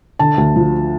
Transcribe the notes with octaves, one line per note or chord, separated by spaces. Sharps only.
D3 A5
D2
F3